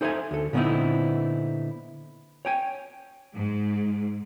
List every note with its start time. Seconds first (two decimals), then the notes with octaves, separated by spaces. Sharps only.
0.01 D#4 A4 C5 D#5 E5 G#5
0.31 D2 A4
0.53 A#2 D3 B3 C4 D#4 E4
2.45 C#5 G5 G#5
3.33 G#2